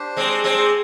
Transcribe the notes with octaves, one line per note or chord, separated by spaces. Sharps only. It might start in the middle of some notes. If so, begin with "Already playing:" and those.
Already playing: D4 G4 C5
G#3 C4
G#3 C4